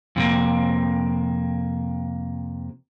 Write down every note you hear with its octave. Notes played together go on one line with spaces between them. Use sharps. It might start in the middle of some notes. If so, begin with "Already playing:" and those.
F2 C3 A#3